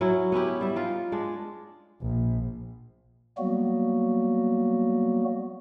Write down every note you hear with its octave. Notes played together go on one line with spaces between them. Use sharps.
F#3 C#4 E4
B3 C#4 E4 G4
G3 E5
D#4 F4 A#4
G#3 D4
A#1
F#3 G3 A#3 B3 F#4